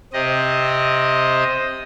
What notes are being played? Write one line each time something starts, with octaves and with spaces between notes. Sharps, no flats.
C3 C4 D#5